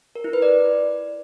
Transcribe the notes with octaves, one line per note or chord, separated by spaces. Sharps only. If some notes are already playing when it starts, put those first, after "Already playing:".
A#4
E4
B4
D5